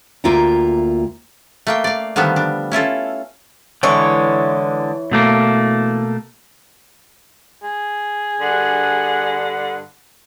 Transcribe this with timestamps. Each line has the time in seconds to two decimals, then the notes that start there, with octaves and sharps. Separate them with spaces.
0.24 D2 A#3 F4 E5 G5 A#5
1.67 A3 A#3 G5
1.84 D5 F5
2.16 D3 D#3 F3 G3 B3
2.36 D4
2.72 C#4 E4 F4 A4
3.83 D3 E3 G#3 C#5
5.11 B2 A3 A#3
7.63 G#4
8.41 G2 D3 F#5